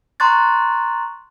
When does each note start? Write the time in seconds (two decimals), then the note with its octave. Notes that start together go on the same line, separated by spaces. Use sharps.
0.20 A#5 C6 C#6 F#6 A6